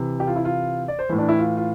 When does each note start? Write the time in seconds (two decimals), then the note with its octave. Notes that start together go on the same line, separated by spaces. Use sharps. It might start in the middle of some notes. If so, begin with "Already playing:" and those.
Already playing: C3 E3
0.20 G4
0.27 F4
0.36 E4
0.45 F4
0.88 D5
0.99 C5
1.09 A2 E3
1.18 D4
1.29 E4
1.39 F4
1.57 F4